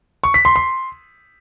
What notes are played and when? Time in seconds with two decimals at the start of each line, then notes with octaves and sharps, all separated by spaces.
0.24 C#6
0.34 B6
0.45 C6
0.56 C6